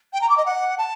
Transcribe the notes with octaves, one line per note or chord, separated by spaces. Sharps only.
G5
A#5
D6
D#5
F#5
A5